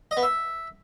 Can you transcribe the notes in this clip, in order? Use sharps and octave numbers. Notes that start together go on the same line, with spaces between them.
D#5
B3
E5